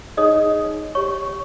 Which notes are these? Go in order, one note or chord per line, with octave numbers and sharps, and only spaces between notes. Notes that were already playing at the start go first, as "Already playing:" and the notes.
D#4 G#4 C#5 D#5 D#6
G4 C#5 C#6